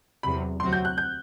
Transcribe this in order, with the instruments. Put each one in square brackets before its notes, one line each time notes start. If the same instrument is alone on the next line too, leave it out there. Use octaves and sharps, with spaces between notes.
[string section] E2 C3 F#3 [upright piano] B5
[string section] D2 C3 F#3 C4 F#4 [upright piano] C6
[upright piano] G6
F#6
G6